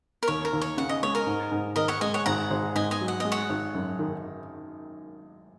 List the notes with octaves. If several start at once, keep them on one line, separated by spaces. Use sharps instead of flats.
A#4
D#2 C#5
A#4
D#2
C#5
C#3 F#5
D#5
G#3 C#5
A#4 D#5
G#2
G#2
D#3 A#4 D#5
C#5 F#5
G#3 D#5 G#5
C#5 F#5
G#1 F#5 A#5
G#1
G#2 D#5 G#5
D#5 G#5
F#3
F#5
G#3 D#5
C#5 F#5
G#1
F#2
D#3